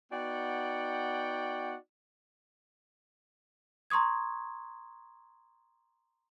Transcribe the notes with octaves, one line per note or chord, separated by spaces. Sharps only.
B3 D#4 F#4 D5 F#5 G5
A#5 C6 C#6 D#6 G#6